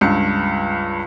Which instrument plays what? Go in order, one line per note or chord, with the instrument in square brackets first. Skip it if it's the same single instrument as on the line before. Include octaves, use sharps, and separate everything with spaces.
[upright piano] C#2 G2 C#7